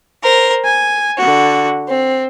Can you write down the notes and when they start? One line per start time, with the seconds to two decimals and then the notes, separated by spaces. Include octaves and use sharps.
0.23 A#4 C5
0.65 G#5
1.18 D3 F#4
1.90 C4